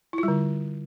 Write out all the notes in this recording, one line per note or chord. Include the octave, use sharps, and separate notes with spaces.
D3 G3 E4 F4